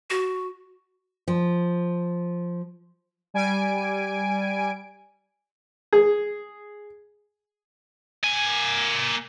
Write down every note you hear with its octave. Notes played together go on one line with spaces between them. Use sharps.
F#4
F3
G3 G#5 D7
G#4
A#3 G#5